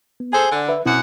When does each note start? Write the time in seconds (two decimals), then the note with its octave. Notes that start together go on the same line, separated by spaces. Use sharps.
0.20 B3
0.33 G#4 A4 C5 G#5
0.52 D3
0.69 B4 E5
0.86 F#2 B2 C4 E4 F#4 F#5